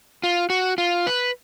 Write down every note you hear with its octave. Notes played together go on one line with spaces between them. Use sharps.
F4
F#4
F4
B4